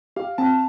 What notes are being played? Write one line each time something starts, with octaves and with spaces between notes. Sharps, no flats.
G4 F5
C4 A5